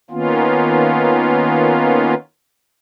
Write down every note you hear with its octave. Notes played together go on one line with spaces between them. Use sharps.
D#3 A#3 B3 C#4 F4